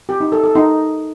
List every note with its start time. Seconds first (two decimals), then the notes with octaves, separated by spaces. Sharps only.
0.09 G4
0.20 D#4
0.32 A4
0.44 A4
0.55 D#4